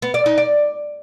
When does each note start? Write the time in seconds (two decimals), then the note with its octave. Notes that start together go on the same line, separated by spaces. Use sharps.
0.02 B3
0.14 D5
0.26 D#4
0.38 D5